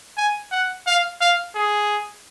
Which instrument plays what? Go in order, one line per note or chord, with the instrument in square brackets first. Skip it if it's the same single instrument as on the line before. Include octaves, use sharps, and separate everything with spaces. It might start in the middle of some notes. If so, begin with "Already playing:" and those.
[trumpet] G#5
F#5
F5
F5
G#4